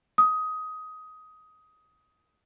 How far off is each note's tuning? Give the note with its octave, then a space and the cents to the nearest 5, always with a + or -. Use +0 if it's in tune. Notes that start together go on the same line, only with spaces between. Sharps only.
D#6 +15